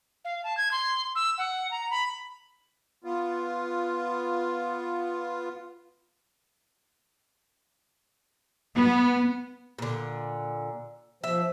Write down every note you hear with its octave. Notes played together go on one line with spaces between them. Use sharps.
F5
A5
G#6
C6
E6
F#5
A#5
B5
B3 F4
B3
A#2 D3
F3 E5